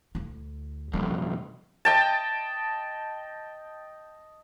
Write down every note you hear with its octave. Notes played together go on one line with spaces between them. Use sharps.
D2 E4
B1 F2 G3
D#5 G5 A5